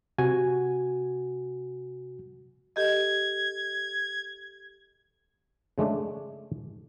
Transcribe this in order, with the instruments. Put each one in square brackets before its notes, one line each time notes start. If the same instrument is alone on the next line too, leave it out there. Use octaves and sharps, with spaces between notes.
[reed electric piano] C3 F#4 G#5
[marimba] G4 A4 D#5 [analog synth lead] G#6
[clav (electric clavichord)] C#3 G#3 A3 D4